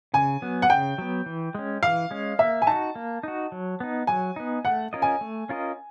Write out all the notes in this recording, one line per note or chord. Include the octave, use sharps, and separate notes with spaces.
C#3 G#5
F#3 B3
F#5
C#3 G5
F#3 B3
E3
G#3 C#4
E3 F5
G#3 C#4
A#3 E5
G#5
D#4 F#4 A5
A#3
D#4 F#4
F#3
B3 D#4
F#3 G#5
B3 D#4
A3 F#5
C#4 F4 A#4 D#5
G#5
A3
C#4 F4 A#4 D#5